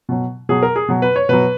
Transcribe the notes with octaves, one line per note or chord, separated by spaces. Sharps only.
B2 F#3
B2 F#3 G#4
A#4
G#4
B2 F#3
B4
C#5
B2 F#3 B4